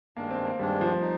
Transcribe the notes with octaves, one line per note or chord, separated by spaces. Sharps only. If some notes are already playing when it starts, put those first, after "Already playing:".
G2 D#3 G#3 A#3 D4
C4
A#3
G2 D#3 G3 G#3 D4
F3
D#4